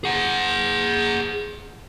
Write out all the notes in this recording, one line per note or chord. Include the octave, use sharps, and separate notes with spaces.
G#4 F#5